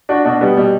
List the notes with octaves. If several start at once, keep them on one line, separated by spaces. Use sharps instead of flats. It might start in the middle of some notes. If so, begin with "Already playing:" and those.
D4 F#4
B2 D4 F#4
G3 B3
B2 G3